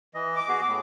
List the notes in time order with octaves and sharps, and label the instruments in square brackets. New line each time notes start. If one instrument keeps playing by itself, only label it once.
[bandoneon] E3 D#5
[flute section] D6
[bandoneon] B3 F#4 G#4
A2